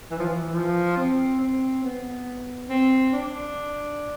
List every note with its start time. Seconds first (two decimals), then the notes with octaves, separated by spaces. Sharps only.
0.11 E3
0.19 F3
0.27 E3
0.53 F3
0.97 C4
1.40 C4
1.84 B3
2.69 C4
3.13 D4